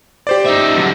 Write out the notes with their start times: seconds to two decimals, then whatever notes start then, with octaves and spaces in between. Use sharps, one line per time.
0.27 G4 C5 D5
0.46 D#4 E5
0.77 F#2 D3